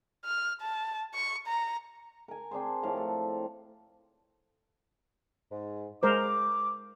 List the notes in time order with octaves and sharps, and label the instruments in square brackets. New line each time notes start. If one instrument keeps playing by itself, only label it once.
[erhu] F6
A5
C#6
A#5
[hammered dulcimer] A#4 G#5
C4 D4 G#4 C5
A2 F3 A#4 F5
A4
[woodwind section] G#2
[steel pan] G#3 A#4 C5 [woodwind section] D6